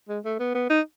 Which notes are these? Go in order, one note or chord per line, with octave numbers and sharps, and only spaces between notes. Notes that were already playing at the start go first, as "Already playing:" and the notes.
G#3
A3
B3
B3
D#4